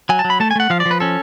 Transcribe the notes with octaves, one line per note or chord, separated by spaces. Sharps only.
F#3 G#5
A5
F#3
B5
A3 A5
G#5
A3 F#5
F3 F5
D5
F3
B4
C#4 A4